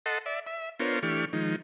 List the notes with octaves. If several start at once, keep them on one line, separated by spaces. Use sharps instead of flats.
A4 D#5 F#5 A5 C6
D5 E5
E5
B3 D4 F4 A#4 C5 C#5
E3 A3 D4 G4 C#6 F6
D#3 F3 G#3 D#4